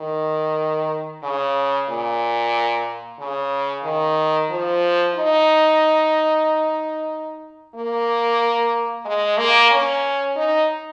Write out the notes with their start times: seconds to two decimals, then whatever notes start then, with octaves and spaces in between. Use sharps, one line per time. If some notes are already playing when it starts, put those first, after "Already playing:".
Already playing: D#3
1.23 C#3
1.89 A#2
3.19 C#3
3.84 D#3
4.50 F3
5.15 D#4
7.75 A#3
9.05 G#3
9.37 A#3
9.71 C#4
10.36 D#4